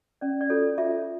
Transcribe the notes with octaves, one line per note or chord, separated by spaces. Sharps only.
C#4 D5
D5
F4 A4 C#5
F4 E5